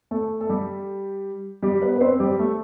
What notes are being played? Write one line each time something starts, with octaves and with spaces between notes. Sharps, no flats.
A3 A4
A4
G3 G4
G3 G4
B3 B4
B4
C4 C5
G3 G4
A3 A4